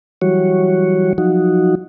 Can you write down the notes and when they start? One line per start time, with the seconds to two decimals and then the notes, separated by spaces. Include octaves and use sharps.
0.22 E3 F#3 G3 F#4 C#5
1.18 F3 F#3 D#4 F#4